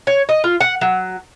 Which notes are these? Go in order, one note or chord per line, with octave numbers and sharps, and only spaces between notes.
C#5
D#5
F4
F#5
F#3